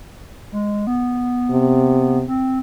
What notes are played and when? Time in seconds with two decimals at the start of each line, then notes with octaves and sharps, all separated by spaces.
0.52 G#3
0.87 B3
1.51 C3
2.28 C4